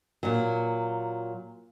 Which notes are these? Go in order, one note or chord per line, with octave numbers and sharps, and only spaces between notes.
A#2 F#3